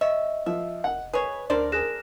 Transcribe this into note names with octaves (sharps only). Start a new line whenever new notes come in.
C#5 D#5 E5
F3 E5
F1 F#5
G#4 B4 C#5
D2 D3 D4 A#4 C5 D5
G#4 A#4 F#6 A#6 E7